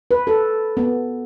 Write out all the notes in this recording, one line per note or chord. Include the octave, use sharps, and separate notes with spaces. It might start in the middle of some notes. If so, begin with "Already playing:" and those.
B4
A4
B3